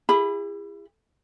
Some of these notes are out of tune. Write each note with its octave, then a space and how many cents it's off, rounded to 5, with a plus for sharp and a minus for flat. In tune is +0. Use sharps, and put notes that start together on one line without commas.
E4 +30 G#4 -40 B5 +0